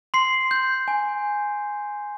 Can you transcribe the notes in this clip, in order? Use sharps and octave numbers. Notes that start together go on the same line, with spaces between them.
C6 C7
G6
G#5